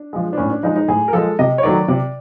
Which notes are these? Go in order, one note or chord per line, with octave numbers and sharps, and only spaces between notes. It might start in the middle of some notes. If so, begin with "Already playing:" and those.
Already playing: D4
F3 G#3
D4
A2 C#4
D4
F3 G#3 D#4
D#4
A2 G#4
A#4
F3 G#3 A4
C3 D#5
C#5
D#3 F#3 A3 D5
C3 D5